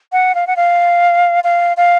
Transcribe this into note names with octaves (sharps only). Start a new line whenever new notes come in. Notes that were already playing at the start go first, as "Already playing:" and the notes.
F#5
F5
F#5
F5
F5
F5